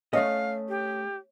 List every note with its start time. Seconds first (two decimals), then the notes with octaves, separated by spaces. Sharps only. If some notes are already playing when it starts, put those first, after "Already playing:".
0.13 A3 C#4 D#5 F5
0.69 G4